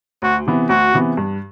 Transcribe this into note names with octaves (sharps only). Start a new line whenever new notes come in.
D2 F#4
C3 E3 B3
D2 F#4
C3 E3 B3
G2